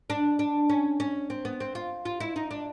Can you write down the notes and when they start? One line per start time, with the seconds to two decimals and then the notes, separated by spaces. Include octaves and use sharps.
0.10 D4
0.39 D4
0.70 C#4
1.00 C#4
1.30 C4
1.45 B3
1.60 C4
1.75 F4
2.05 F4
2.20 E4
2.36 D#4
2.51 D4